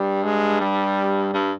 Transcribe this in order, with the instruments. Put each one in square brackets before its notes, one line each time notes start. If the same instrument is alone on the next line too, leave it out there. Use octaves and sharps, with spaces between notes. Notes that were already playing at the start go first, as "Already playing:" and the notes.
Already playing: [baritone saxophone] G2 [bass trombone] G3
[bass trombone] G#3
G3
[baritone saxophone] G2